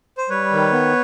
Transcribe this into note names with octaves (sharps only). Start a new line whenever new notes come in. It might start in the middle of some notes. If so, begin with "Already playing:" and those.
C5
G3 B4 C#5
D#3
B3